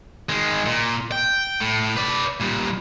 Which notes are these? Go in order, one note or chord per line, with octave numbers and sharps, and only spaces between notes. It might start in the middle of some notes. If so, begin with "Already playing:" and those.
D#3 G#3
A#2
G5
A2
B4 D5
A#2 G3